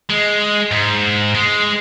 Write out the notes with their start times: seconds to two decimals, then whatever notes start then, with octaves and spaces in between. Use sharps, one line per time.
0.09 G#3
0.71 G#2
1.35 G#3